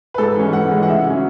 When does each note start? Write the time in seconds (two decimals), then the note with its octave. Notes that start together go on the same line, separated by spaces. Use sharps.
0.14 B4
0.18 G#2 A4
0.36 E3 G#3 C#4
0.53 G#2 F#5
0.71 E3 G#3 C#4
0.83 F#5
0.88 C#3 E5
1.06 F#3 C#4